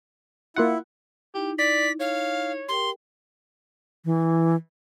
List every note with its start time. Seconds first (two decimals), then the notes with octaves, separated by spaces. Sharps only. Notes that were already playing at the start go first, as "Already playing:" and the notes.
0.56 A#3 E4 F4 F#5
1.34 D#4 E4 G4
1.58 D5 B6
2.00 C#5 F5
2.69 G4 A#4 G5 C6
4.05 E3